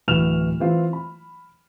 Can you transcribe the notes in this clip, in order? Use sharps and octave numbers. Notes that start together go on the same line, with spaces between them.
D1 E3 F#4 F6 E7 F7
E3 C4 F4
B5